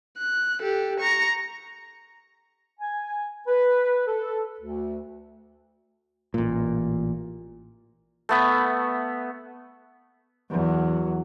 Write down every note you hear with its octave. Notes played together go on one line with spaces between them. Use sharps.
F#6
G4 A4
A#5 C#6
G#5
B4
A4
D2
A1 A#2
A3 B3 E5
E2 F#3